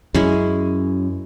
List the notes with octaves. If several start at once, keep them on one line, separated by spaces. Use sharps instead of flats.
F#2 G#3 C#4 E4